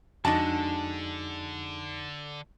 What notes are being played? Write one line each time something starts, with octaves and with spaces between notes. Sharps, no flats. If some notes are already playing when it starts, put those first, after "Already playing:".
F2 D3 G#3 D4 D#4 F#4 A5